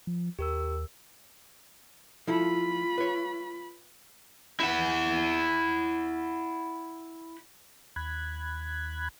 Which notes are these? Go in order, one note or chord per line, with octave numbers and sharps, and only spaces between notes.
F3
D#2 G4 A#4 E6
F3 E4 F4 A4 B5
B4 C#5
E4 F#5
D#2 B5 F#6 G#6